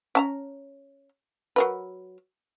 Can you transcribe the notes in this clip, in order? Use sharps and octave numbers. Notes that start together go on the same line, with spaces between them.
C#4 A5 A#5
F#3 A#4 B4